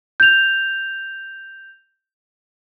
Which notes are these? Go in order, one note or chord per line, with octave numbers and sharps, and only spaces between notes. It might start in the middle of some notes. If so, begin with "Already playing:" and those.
G6 F7